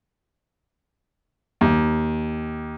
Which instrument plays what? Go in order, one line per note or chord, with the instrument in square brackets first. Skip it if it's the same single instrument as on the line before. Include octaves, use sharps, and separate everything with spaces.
[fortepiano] D#2